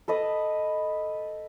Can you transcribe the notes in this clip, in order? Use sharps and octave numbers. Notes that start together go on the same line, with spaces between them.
A4 B4 D#5 D#6